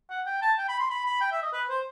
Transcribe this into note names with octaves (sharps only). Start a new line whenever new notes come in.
F#5
G5
A5
G5
B5
C6
B5
B5
G5
E5
D#5
B4
C5